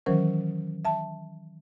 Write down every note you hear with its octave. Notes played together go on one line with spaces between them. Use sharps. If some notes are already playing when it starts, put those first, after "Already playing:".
D#3 E3 F#3 C#4 A#4 C5
E5 A5